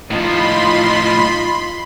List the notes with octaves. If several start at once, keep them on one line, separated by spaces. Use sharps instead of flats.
A2 F3 D#4 F4 B5 C6